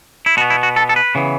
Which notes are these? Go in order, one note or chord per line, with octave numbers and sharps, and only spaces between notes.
E4
B2 B3 F#4
E4
F#4
A4
A4
B4
C#3 E3 B3